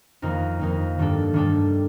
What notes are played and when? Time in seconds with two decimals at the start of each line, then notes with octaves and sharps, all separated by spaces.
0.22 F2 D#3 A#3 D#4 A#4
0.59 F2 D#3 A#3 D#4 A#4
0.99 G2 D#3 G3 D4 A4
1.34 G2 D#3 G3 D4 A4